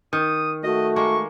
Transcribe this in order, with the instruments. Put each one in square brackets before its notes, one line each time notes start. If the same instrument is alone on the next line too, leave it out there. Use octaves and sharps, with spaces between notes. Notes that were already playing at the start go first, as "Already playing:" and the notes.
[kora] D#3 [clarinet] D#6
[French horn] A3 [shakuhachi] F#4 [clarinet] D#5
[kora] G#3 A#3 [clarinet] C#6